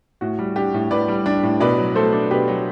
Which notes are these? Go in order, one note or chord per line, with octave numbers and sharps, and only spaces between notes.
A2 F#4
G3
D4 G4
A2
A2 B4 D5
G3
D4
A2
B2 B4 D5
F#3
A3 A4 C5
D4
B2 G4 B4
F#3